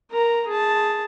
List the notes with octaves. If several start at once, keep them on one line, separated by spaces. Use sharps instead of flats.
A#4 A#5
G#4 A5